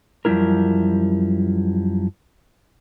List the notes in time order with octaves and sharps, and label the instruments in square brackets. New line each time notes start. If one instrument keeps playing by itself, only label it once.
[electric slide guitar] F#2 F3 G3 C4 E4 A#4